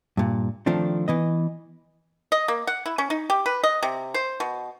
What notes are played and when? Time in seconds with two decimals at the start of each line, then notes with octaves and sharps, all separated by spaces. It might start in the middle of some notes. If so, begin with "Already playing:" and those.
0.17 G2 A#2
0.66 D#3 F3 A3 C4 D4
1.08 E3 B3 D#5
2.32 D#5
2.48 A#3
2.67 F#5
2.86 E4
2.98 C#4
3.10 D#4
3.30 G4
3.46 B4
3.63 D#5
3.83 C3
4.14 C5
4.40 B2